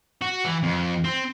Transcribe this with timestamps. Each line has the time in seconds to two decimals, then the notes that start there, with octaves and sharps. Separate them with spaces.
0.21 F#4
0.45 E3
0.63 F2
1.04 C4